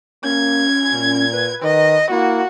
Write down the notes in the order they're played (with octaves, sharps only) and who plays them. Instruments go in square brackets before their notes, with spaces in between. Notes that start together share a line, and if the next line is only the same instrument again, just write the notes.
[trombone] A#3 [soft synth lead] C#4 [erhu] G#6
[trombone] A#2
[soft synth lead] B4
[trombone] D#3 [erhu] D#5
[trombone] A#3 [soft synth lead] E4 [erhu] F#4